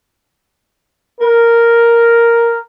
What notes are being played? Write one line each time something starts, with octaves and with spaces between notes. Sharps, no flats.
A#4